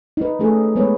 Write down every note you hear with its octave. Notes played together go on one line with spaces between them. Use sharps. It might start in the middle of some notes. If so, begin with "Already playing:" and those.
D#4 B4
A3 C#4 G#4 A4
G#3 B3 B4 C#5